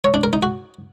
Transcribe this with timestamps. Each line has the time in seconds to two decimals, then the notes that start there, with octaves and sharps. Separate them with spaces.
0.04 C#5
0.14 D4
0.23 A#4
0.33 D#4
0.43 F#4